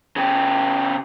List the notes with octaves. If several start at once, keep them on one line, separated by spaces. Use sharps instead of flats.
C#3 G4